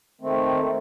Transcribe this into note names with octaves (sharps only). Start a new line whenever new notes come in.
D#3 A3 C4